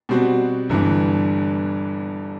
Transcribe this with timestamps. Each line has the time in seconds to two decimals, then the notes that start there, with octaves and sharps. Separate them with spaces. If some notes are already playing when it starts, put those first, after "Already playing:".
0.09 B2 G3 C4 F#4
0.69 G1 G2 E3